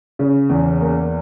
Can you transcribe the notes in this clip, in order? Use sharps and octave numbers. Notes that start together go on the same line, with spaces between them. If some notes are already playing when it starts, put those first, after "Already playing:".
C#3
E2
A#3